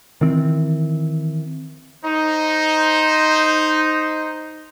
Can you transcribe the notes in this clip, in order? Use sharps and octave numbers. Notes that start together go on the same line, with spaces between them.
D#3 E3 C4
D#4 C5